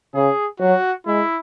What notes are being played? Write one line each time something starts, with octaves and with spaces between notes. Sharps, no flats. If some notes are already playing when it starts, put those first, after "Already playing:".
C#3 G#4
F#3 F#4
G#3 E4